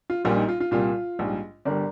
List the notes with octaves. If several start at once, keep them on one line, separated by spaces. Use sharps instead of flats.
F4
A#1 A#2 G3 F4
D#4
F4
F4
C2 A#2 G3 F4
A#1 G#2 G3
G1 D3 G3 A#4 D5